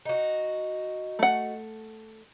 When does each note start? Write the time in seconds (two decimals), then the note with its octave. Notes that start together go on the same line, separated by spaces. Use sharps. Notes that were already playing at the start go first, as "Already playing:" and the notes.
0.05 D#4 F#4
1.19 A3 F#5